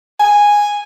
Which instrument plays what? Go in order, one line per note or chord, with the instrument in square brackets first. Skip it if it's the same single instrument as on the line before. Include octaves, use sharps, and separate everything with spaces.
[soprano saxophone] G#5